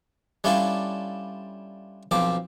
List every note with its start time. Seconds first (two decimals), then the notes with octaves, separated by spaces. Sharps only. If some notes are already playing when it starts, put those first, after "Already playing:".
0.44 G3 C#4 D4 E4 F4 A4
2.11 B1 F3 C4 D6